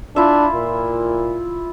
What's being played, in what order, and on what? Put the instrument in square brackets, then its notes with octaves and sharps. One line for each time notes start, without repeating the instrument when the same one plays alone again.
[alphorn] D4 [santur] E4 F4 E5
[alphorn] A#2